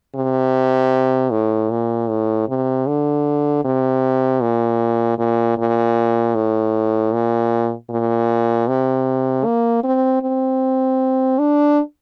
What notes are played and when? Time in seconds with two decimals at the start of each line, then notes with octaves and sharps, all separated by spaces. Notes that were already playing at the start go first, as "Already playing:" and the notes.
0.16 C3
1.32 A2
1.71 A#2
2.09 A2
2.48 C3
2.87 D3
3.65 C3
4.41 A#2
5.19 A#2
5.58 A#2
6.35 A2
7.13 A#2
7.90 A#2
8.68 C3
9.45 A#3
9.84 C4
10.22 C4
11.39 D4